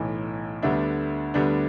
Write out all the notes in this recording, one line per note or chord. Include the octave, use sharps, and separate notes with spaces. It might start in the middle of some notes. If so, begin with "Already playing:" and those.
Already playing: B1 A2 E3
D2 D3 G3 B3 D4 E5
D2 D3 G3 B3 D4